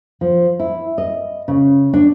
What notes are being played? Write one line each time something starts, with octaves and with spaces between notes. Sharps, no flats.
F3
E4
D#5
C#3
D4